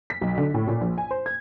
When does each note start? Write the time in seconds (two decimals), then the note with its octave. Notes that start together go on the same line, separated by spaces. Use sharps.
0.10 B6
0.21 B1
0.38 D3
0.54 A2
0.67 A#2
0.81 A#1
0.98 G#5
1.11 C5
1.26 G#6